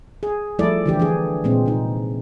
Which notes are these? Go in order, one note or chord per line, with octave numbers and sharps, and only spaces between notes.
G#4
F3 G3 A3 E4 A4 D5
D3 E3 G4
E3 D4 G#4
A#2 G#3 C4
C3 D#4